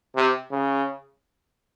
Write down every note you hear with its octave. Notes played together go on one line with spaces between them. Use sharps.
C3
C#3